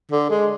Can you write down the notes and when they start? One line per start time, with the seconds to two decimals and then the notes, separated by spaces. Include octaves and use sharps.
0.11 D3
0.30 G#3